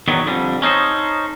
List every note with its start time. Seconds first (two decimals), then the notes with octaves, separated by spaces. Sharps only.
0.08 E2 D#3 F#3 B3
0.26 F2 D3 G3
0.62 C#4 D#4 A4 C5